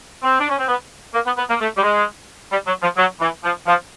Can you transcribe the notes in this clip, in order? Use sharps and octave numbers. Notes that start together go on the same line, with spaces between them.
C4
D4
C#4
C4
B3
A#3
B3
B3
A#3
A3
G3
G#3
G3
F#3
F3
F#3
E3
F3
F3